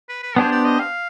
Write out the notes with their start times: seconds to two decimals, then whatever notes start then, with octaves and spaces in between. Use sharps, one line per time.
0.09 B4
0.23 B4
0.36 B3 D4 G4 G#4 C5
0.52 D5
0.65 D#5
0.80 F5